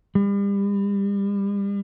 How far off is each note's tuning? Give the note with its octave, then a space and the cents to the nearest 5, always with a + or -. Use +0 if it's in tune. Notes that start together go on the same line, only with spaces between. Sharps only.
G3 +35